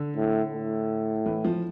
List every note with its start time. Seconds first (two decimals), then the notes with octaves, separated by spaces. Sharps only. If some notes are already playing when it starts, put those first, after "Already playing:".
Already playing: D3
0.16 A2
0.53 A2
1.26 E3
1.45 F3